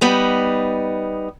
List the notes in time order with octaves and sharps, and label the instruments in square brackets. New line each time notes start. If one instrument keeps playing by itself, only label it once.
[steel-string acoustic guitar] G3 B3 D#4